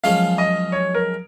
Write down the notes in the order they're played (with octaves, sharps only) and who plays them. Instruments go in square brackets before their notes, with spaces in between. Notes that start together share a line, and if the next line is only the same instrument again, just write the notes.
[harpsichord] F#2 F3 G#3 C#4 [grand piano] F5
[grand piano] D#5
C#5
A#4